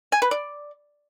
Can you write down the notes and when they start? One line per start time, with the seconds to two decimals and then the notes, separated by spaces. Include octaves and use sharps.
0.12 G#5
0.22 B4
0.31 D5